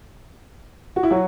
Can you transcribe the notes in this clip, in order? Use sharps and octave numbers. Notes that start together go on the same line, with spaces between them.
F#4
E4
F#3 F#4